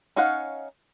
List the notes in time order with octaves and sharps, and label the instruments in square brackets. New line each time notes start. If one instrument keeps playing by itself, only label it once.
[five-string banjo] C#4 D#4 C#5 F5 F#5